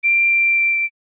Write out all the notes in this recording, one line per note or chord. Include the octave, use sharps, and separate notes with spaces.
D7